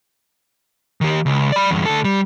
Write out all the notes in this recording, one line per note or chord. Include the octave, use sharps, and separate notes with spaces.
D#3 G4
C#2
D5 B5
E2 G2
D2 A4
G3